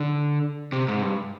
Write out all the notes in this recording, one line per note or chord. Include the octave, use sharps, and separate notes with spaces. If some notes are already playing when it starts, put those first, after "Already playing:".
Already playing: D3
C3
G#2
G2